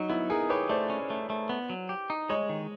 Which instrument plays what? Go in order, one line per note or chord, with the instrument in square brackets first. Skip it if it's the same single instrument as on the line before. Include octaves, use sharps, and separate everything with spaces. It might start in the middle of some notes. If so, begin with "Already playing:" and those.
Already playing: [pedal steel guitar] F#3 [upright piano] D#4
[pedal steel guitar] B3 [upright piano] E4
[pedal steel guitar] D#4 [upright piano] G#4 A#4
[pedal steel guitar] G4 [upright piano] B4 C#5
[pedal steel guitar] A3 [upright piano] C5 D5
[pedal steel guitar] C#4
A3
A3
B3
F#3
G4
D#4
[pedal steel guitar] G#3 [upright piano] C#5 D#5
[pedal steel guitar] D#3